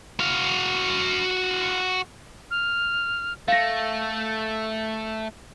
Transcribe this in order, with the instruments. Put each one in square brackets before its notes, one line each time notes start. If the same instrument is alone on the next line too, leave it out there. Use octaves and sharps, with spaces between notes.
[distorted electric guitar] F#4 F5
[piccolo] F6
[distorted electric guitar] A3 [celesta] F5 A#6